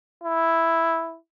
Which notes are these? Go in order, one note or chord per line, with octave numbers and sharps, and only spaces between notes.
E4